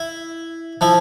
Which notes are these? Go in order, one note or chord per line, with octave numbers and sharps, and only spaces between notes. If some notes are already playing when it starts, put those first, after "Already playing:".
Already playing: E4
F3 E4